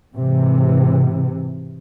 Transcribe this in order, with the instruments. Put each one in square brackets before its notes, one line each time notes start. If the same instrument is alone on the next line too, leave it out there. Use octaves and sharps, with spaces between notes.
[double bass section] G#2 C3 E3